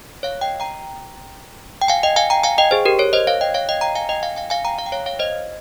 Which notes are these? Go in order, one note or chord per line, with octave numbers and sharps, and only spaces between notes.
C#5 F5
D#5 G5
G5 A#5
G5
F5 G#5
D#5 G5
F5 G#5
G5 A#5
F5 G#5
D#5 G5
G#4 C5
G4 A#4
A#4 C#5
C5 D#5
C#5 F5
D#5 G5
C#5 F5
D#5 G5
G5 A#5
F5 G#5
D#5 G5
F5 G#5
F5 G#5
F5 G#5
G5 A#5
F5 G#5
G5
C#5 F5
C#5 F5
C5 D#5